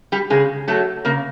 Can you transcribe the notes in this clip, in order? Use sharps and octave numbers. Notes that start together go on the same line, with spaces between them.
G3 G4
C#3 G#3 G#4
F#3 A3 A4
C#3 A#3 A#4